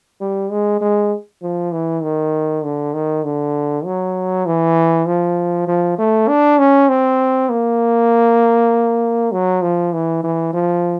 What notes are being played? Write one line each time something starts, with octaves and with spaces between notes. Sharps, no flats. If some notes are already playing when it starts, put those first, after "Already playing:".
G3
G#3
G#3
F3
E3
D#3
D3
D#3
D3
F#3
E3
F3
F3
A3
D4
C#4
C4
A#3
F#3
F3
E3
E3
F3